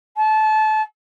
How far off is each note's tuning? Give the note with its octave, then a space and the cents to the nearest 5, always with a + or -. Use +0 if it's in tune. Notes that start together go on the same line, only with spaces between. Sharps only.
A5 -25